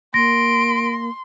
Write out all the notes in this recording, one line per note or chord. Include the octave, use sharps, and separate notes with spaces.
A#3 C6 A#6 D7